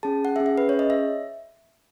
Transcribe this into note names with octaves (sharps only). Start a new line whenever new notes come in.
C#4 G#4 A5
F#5
C#4 G#4 E5
E5
B4
C#4 G#4 C#5
D#5
E5